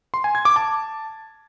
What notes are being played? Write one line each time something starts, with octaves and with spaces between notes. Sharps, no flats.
C6
G#5
G#6
D6
A5